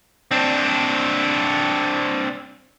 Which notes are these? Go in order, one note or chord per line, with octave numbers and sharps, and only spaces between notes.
C4 D4